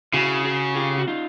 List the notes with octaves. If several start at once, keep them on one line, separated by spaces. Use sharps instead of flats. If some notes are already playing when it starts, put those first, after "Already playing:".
C#3 E4 F#4
F#4 G#4
F4 G4
F#4
D#4 F4